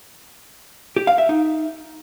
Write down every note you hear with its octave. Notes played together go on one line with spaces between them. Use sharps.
G4
F5
E5
D#4